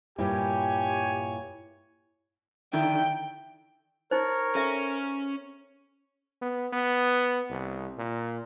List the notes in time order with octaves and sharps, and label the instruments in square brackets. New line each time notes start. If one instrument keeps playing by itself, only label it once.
[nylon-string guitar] G2 A#2 [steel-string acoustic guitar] E4 [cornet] G4 [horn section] C#5 G#5
[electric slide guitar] D3 D#3 [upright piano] E4 [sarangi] G5
[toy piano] D#4 C5 [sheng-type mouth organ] A#4 C#5
[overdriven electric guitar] C#4 [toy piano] A4 E5
[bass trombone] B3
B3
C2
A#2